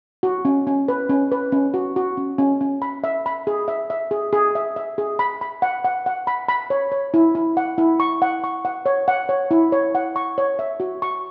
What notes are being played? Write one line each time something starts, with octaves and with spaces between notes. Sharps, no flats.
F#4
C#4
C#4
B4
C#4
B4
C#4
F#4
F#4
C#4
C#4
C#4
B5
E5
B5
G#4
E5
E5
G#4
G#4
E5
E5
G#4
B5
B5
F#5
F#5
F#5
B5
B5
C#5
C#5
E4
E4
F#5
E4
C#6
F#5
C#6
F#5
C#5
F#5
C#5
E4
C#5
F#5
C#6
C#5
E5
F#4
C#6